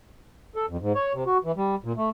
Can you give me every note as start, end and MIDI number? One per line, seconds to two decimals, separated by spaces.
0.56 0.66 69
0.69 0.77 41
0.81 0.93 44
0.95 1.13 73
1.14 1.24 48
1.26 1.38 66
1.44 1.52 52
1.57 1.75 55
1.84 1.93 46
1.97 2.09 57